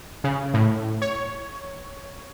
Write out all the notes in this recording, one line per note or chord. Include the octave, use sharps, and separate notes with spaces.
C#3
A2
C#5